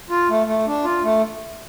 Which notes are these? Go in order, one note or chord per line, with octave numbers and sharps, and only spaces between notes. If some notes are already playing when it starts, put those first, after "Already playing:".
F4
A3
A3
D4
F4
A3